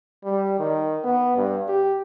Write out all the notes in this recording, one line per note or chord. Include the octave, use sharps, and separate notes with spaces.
G3
D#3
B3
G2
G4